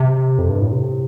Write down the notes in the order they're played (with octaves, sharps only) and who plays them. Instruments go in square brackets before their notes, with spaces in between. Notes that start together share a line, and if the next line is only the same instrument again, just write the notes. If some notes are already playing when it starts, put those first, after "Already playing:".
Already playing: [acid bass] C3
F2
G2
A2
C3